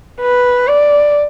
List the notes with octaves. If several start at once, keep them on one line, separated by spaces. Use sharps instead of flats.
B4
D5